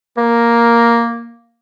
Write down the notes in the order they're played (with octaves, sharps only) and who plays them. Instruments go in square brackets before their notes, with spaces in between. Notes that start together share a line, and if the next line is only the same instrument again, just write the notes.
[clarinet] A#3 [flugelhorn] A#4